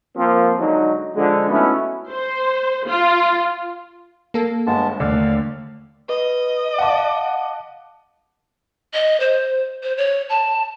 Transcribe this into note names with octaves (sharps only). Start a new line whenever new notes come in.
F3 A#3 C4
D3 F#3 G#3 D#4
D3 F3 G#3
A3 B3 C#4 D#4 E4 F#4
C5
F4
A#3 A4
G1 G#3 B3 A5
D#2 D3 A3 D5 F5
B4 D#5
F5 F#5 A5 D6
D#5
C5
C5
C#5
A5